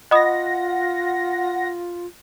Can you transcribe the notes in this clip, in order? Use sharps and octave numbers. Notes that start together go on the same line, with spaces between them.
F4 D#5 F#5 B5 D#6 A#6